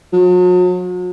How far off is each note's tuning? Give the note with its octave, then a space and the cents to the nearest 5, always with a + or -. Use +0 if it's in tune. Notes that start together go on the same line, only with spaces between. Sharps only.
F#3 -40